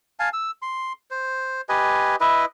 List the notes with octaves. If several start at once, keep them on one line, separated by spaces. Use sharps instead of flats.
F5 G#5 A5
E6
C6
C5
G4 B4 D#5 G#5
E4 B4 D#5